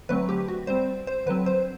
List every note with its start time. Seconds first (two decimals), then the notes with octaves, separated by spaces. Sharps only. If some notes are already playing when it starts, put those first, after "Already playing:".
0.09 D3 F#3 A3 C4 B4
0.29 G4
0.48 F#4
0.67 G3 C4 C5
1.07 C5
1.26 D3 F#3 C4 B4
1.46 C5